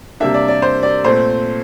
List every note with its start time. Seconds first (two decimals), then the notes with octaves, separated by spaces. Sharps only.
0.20 C3 G3 A#3 D4 E5
0.34 D5
0.48 D5
0.62 C5
0.83 D5
1.04 A#2 A3 C4 C5